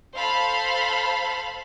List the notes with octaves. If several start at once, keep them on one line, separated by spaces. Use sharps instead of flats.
A4 C5 F5 A5 B5